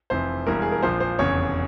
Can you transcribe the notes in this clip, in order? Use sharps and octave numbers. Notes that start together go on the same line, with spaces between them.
F1 F2 E3 C5
E1 E2 E3 G3 A#4
G#4
A#4
A#1 A#2 F3 C5
C5
F1 E2 C#3 C#5